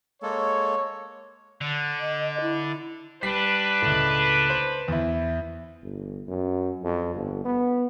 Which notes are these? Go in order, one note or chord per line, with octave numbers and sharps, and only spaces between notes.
G#3 A#3 A4 C#5
D3
D#5
E4
G3 D4 B4 B6 C7
C#2 A2
C5
E2 E4
G1
F#2
F2
G1
B3